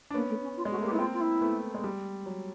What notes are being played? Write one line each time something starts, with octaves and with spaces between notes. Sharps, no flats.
D4
A#3 B3 C#4
A3
C#4
F4
G#3
F#4
A3
A#3 G4
B3 E4
A#3 C4 F4
F4
E4
A3 B3
G#3
G3
F#3